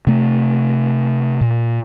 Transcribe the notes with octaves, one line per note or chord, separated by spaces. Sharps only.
C3 A3
A#2